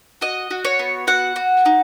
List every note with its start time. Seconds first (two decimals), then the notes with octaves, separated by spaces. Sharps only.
0.21 F#4 D#5
0.51 F#4
0.65 C#5
0.79 B3
1.07 F#4 F#5
1.36 F#4
1.66 D#4